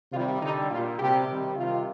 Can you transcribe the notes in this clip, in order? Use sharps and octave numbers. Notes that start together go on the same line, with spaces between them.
C3 D#3 G3 F4
D3 G3 D#4
A#2 G3 F4
C3 G3 G4
C3 D#3 G3
C3 D#3 G3 F4